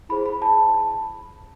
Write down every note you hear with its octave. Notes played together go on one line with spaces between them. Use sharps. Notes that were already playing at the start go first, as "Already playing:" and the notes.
E4 G#4 C5 B5
B5
A5